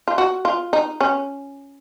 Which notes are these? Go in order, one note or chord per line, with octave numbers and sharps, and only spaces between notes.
F4
F#4
F4
D#4
C#4